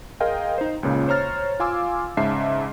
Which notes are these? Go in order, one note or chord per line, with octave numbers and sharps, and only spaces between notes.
G#4 A#4 D#5 F5 G5 C6
D#4 C5
C#2 A#2 C#3
C5 C#5 A#5 F6 A6
F4 F5 G#5 C6 D6 E6
G#2 C#3 E5 A5 C7